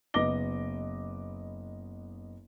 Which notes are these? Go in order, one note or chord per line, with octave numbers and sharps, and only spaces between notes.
F#1 B3 D#5 D6 A#6 G7